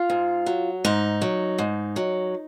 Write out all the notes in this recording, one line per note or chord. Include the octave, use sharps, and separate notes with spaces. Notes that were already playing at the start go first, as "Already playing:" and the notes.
Already playing: F4
G#2
F#3
G#2 D#4
F#3
G#2
F#3